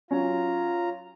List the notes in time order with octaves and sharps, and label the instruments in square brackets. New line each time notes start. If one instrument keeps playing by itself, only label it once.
[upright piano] F#3 C#4 [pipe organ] F4 A#5